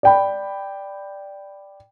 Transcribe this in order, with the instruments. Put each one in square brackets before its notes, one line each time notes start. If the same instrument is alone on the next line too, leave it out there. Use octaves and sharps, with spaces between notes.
[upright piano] D5 G5 B5